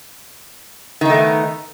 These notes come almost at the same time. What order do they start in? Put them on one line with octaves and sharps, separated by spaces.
D#3 D#4 A3 B3